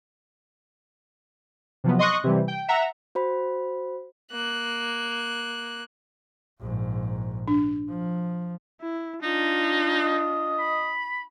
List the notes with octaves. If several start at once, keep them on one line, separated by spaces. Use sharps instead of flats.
C3 F3 F#3 B3
D#5 C6 C#6 D#6 F#6
C3 E3 G3
G5
E5 F#5 A#5
F#4 C5 B5
A#3 F#6
A#1 G#2
D4
F3
E4
D4 D#4 F4
D#5
B5